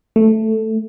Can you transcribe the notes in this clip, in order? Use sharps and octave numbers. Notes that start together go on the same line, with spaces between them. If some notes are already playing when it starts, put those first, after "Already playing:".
A3